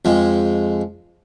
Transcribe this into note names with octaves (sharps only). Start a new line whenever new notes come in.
F2 G#3